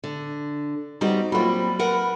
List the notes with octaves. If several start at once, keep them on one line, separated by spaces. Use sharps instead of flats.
D3
G3 B3 C4 D#4 F#4
F#3 G3 A#3 C4 F4 B5
A#4 B4 F#5